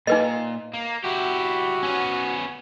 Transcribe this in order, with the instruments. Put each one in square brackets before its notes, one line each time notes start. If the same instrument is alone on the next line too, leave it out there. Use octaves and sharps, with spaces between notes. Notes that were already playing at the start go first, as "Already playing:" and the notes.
[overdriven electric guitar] A#2 [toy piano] D#4 B4 D#5
[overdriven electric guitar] A#3
[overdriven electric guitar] E4 G4 [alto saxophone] F#4
[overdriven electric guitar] B3 C#4